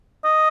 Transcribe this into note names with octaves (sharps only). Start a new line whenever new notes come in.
D#5